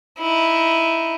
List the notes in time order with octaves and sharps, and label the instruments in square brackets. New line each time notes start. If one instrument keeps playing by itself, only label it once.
[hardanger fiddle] D#4 E4